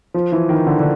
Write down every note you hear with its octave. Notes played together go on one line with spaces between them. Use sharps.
F3
E3
D#3
D3
D3